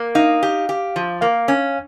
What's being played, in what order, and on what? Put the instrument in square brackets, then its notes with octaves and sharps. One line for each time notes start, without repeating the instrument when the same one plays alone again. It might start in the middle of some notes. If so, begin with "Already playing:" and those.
Already playing: [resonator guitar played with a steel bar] A#3
[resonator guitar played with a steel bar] D#4 [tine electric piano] F5
[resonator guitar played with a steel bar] G4
G4
F3
[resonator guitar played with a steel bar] A#3 [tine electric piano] F5
[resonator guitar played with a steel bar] C#4